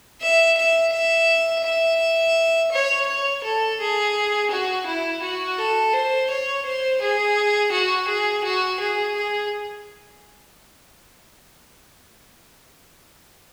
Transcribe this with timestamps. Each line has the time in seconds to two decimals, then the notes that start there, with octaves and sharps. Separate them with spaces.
0.21 E5
0.58 E5
0.93 E5
1.65 E5
2.72 C#5
3.08 C#5
3.44 A4
3.80 G#4
4.51 F#4
4.87 E4
5.22 F#4
5.58 A4
5.93 C5
6.30 C#5
6.65 C5
7.01 G#4
7.72 F#4
8.08 G#4
8.44 F#4
8.80 G#4
9.16 G#4